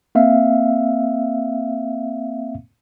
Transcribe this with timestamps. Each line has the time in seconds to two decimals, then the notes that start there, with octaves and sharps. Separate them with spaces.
0.15 A#3 C4 E5 F5